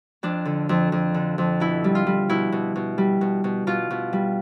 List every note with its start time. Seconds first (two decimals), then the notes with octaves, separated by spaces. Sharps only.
0.23 F2 D4
0.45 D3
0.69 F2
0.92 F2
1.14 D3
1.38 F2
1.60 B2 E4
1.84 G3
1.95 F4
2.07 G3
2.29 B2 E4
2.52 B2
2.76 B2
2.98 G3
3.21 B2
3.44 B2
3.67 B2 F4
3.90 B2
4.13 G3